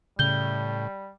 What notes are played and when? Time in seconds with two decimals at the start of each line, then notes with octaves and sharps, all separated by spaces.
0.19 A2 C#3 G3 G6 G7